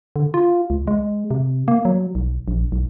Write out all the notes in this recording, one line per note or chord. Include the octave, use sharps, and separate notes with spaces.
D3
F4
C#2
G#3
C3
A#3
F#3
B1
A#1
B1